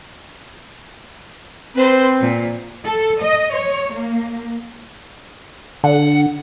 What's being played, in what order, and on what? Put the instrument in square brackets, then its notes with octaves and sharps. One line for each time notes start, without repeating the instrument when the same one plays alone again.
[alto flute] C4 [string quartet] B4 C5 C6
[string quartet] A#2
[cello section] A4
D#5
C#5
A#3
[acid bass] D3 [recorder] F#5